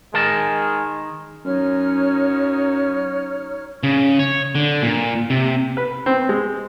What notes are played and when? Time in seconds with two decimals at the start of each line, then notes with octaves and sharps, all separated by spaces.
0.14 D#3 G#3 A#4 A5
1.45 F#2 D#4 C#5 F6
3.83 C#3
4.19 C#5
4.55 D3
4.82 A#2
5.30 C3
5.77 B4
6.06 C4
6.29 G#3